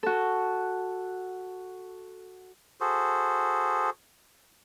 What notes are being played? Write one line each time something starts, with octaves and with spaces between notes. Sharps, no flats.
F#4 A4
F#4 G#4 A4 C5